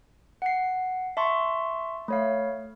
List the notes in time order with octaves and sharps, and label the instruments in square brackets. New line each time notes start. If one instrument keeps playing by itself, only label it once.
[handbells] F#5 C7
E5 A5 C6 C#6
A3 C#5 F5